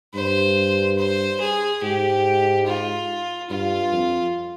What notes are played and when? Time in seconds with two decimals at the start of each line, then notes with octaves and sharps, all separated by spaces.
0.14 G2 C5
0.98 C5
1.40 G#4
1.82 G#2 G4
2.66 F4
3.50 G2 F4
3.92 F2